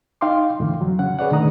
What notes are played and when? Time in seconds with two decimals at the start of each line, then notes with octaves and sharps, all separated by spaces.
0.21 D#4 F5 G5 C6 D6
0.60 F2 A2 D3 E3
0.81 F#3
0.99 C#3 C#4 F#5
1.19 G#4 B4 C#5 D5 F#5
1.31 A#2 D3 D#3 A3 A#5 D#6